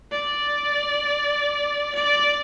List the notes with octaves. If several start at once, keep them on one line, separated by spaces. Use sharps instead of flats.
D5
D5